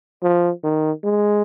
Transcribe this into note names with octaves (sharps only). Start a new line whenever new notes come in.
F3
D#3
G#3